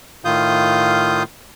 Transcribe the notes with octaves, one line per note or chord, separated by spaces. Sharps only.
A2 D#3 F4 F5 D#6 G6